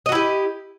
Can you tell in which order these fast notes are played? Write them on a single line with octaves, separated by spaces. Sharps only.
D#5 F#4 E4 G4